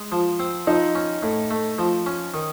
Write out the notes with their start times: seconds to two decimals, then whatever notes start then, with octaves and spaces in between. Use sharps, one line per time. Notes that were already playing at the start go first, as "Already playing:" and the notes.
Already playing: G#3
0.12 F3
0.39 C4
0.67 F3 D#4
0.95 C#4
1.23 A2
1.51 A3
1.78 F3
2.06 C#4
2.34 D#3